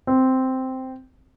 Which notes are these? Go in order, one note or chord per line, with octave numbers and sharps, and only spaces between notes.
C4